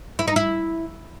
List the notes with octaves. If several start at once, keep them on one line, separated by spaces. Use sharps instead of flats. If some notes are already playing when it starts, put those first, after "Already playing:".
E4
D#4
E4